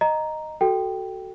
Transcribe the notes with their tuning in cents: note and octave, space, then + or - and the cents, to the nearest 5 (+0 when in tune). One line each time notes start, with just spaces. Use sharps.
D#5 -5 A#5 +0
F#4 +15 A4 +0 G5 +0